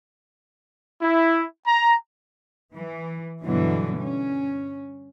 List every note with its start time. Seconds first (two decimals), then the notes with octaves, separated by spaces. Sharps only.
1.02 E4
1.67 A#5
2.74 E3
3.43 G2 B2 D3 E3 F#3
3.99 C#4